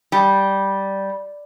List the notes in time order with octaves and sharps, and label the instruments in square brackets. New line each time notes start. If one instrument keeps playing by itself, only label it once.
[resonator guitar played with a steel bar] G3